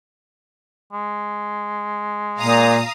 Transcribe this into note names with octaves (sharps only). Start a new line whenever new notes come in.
G#3
A#2 F5 A#5 D#6